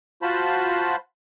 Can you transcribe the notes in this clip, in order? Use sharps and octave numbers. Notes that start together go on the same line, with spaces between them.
F4 F#4 C5 A5 B5